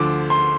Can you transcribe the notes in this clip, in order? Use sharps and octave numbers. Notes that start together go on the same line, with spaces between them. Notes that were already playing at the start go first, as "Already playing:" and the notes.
Already playing: D2 D3 F3 D6
C6